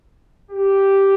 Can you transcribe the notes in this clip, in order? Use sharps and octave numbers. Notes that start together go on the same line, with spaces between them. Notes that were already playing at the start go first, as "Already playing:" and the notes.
G4